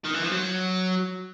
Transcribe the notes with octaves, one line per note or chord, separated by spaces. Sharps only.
D#3
E3
F3
F#3